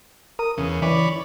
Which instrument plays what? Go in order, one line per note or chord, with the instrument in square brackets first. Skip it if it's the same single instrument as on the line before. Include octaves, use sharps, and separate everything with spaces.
[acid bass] A#4 [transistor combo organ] D#6
[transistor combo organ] E2 C#3
[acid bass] E3 [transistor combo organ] C#5 D5 B5